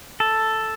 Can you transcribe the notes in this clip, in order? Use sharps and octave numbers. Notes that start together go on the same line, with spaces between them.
A4